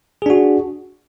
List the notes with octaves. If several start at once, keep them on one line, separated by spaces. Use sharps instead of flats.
D4 F#4 G#4